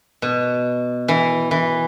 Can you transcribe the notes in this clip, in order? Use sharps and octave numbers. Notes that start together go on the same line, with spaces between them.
B2
E3
E3